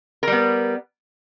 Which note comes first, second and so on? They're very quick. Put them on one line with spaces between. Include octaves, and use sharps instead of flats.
A#4 G3 B3